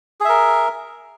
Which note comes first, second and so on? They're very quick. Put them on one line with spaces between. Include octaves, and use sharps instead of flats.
G#4 E5 A#4